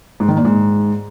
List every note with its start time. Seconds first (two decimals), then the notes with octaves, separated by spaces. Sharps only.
0.20 G#2
0.28 D#3
0.37 A#2
0.45 G#2